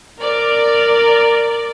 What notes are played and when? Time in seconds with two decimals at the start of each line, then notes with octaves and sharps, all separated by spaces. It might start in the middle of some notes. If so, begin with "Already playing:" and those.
0.21 A#4 D5